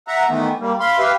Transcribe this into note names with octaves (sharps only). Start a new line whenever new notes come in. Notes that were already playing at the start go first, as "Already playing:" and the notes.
E5 F#5 A#5
D#3 E3 A3 B3
G3 A#3
F5 B5 C6
G4 B4 E5 F5